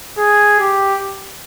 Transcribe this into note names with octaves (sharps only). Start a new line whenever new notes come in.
G#4
G4